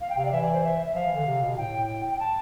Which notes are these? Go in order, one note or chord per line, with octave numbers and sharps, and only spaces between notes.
F5
G5
C3 F5
D5
E3 E5
D5
C5
E5
E5
F3 F5
E3
D3
C3
B2
A2 G5
G5
A5